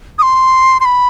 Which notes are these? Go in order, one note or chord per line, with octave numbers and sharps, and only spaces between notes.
D#6
C6
C6
B5